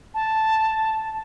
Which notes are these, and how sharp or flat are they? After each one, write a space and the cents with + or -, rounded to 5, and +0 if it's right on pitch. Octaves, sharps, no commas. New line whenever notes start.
A5 +0